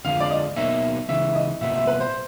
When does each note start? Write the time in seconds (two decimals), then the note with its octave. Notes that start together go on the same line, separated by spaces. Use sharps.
0.05 F2 D3 F3 G#3 F5
0.20 D5
0.30 D#5
0.56 B2 F#3 A#3 D#4 E5
1.09 C#2 C#3 E3 E5
1.35 D#5
1.61 C2 A#2 G3 B3 E5
1.74 E5
1.87 B4
2.00 C5